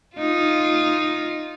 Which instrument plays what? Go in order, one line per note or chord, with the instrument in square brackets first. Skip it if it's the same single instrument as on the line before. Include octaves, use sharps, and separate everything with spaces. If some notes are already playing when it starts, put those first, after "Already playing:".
[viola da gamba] D#4 F4